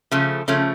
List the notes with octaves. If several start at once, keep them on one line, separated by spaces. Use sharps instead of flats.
C#3 F3 A3
C#3 F3 A3 C#4